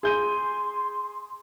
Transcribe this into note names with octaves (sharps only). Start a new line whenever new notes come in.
G#4 C6 G6 D#7